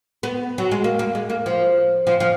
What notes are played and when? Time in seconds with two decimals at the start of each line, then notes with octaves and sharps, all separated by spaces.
0.23 B3
0.58 F#3
0.71 G#3
0.84 A#3
0.99 A#3
1.15 G#3
1.30 A#3
1.46 F3
2.07 F3
2.20 F3